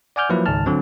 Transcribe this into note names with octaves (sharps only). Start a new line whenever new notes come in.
D5 F#5 G#5 D6 F6 G6
F3 F#3 A#3 E4 B4
C#2 G#2 D#3 A5 F6
D3 F#3 C4